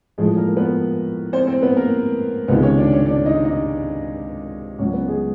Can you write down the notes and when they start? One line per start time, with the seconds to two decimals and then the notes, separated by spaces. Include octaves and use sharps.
0.18 A2 F3 G#3 A3 G#4
0.37 A#3 A#4
0.57 B3 B4
1.33 C4 C5
1.47 C4 C5
1.61 B3 B4
1.76 A#3 A#4
2.48 C#2 C3 D#3 G#3 B3 B4
2.63 C#4 C#5
2.78 D4 D5
2.92 C#4 C#5
3.06 D4 D5
3.26 D#4 D#5
3.45 D#4 D#5
4.79 C#2 C#3 F#3 C#4 C#5
4.93 B3 B4
5.08 G#3 G#4